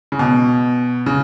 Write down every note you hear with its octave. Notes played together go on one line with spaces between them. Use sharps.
C#3
B2
C#3